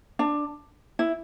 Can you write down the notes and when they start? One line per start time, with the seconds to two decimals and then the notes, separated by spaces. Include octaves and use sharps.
0.19 D4
0.99 E4